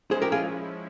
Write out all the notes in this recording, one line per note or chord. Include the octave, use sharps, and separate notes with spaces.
F3 G#3 C#4 E4 G#4 C5
G4 A#4
F4 G#4